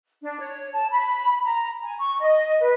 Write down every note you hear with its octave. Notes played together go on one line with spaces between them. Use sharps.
D4
C#5
A5
B5
A#5
G#5
C#6
D#5
B4